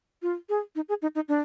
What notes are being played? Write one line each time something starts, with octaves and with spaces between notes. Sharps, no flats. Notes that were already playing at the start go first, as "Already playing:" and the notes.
F4
G#4
D#4
G#4
D#4
D#4
D4